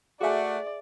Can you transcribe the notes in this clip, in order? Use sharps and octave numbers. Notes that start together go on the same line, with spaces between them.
A3 F#4 G#4 D5 E5 G#5